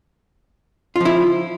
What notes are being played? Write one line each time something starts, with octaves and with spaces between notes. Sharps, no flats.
F3 E4 F4